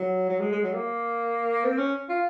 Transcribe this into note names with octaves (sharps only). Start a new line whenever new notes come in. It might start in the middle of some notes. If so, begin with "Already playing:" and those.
Already playing: F#3
F#3
G#3
G#3
F#3
A#3
C4
C#4
F4